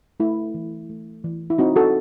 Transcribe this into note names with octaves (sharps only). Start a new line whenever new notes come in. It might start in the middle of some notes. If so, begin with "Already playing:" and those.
A3 E4
E3
A3
E3
E4
C4 D#4 F#4
F#4 A4